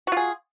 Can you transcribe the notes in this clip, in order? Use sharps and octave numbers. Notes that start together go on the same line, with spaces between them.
F4 F#4 G#4